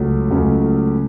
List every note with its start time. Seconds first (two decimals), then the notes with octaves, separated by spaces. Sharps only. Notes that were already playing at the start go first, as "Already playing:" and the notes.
Already playing: C#2 C#3 F#3 A3
0.31 C#2 C#3 F#3 A3